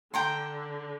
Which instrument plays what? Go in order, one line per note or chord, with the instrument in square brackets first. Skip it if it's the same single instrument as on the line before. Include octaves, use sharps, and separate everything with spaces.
[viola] D3 [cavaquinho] G5 A#5 C6